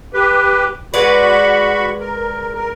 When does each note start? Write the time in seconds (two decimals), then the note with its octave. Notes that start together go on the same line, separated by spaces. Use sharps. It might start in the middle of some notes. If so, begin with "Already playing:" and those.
0.14 G4 B4
0.94 G#3 F#4 B4 D5 B5 C#6
2.00 A#4
2.55 A#4